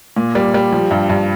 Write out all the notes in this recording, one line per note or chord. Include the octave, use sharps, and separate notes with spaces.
A#2
G3
G3
F3
G2
G2